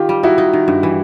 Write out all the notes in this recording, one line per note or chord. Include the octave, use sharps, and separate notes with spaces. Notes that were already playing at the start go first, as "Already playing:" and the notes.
Already playing: D#3 F4 G4
G3
D#4 E4 F#4
D#4
D#3
G2
E3